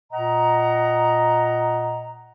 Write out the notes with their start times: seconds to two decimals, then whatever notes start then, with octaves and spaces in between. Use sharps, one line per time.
0.13 A#2 D#5 F#5 A#5